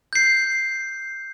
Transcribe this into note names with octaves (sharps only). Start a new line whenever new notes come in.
G6 C7